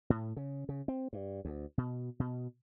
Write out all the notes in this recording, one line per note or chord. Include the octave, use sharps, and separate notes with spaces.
A2
C#3
C#3
C4
G2
D2
B2
B2